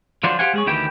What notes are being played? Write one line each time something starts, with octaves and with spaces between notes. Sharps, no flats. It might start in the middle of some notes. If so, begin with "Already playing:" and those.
D3 F3 F#3 D4 F4 C5
G4 C5 F5 F#5 G#5
G#3 G#4 C#5
D2 D#3 E3 G4 G5